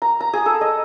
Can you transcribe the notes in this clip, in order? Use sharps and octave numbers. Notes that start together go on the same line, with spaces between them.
A#5
A#5
G#4
A4
D#5